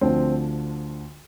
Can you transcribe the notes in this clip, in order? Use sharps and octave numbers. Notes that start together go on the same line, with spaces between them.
D2 D3 F3 C4